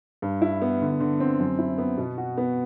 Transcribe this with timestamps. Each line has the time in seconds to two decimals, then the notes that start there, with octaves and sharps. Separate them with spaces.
0.22 G2
0.42 E4
0.62 B3
0.82 D3
1.00 D3
1.20 C4
1.39 F#2
1.58 E4
1.78 B3
1.98 B2
2.18 F#4
2.38 B3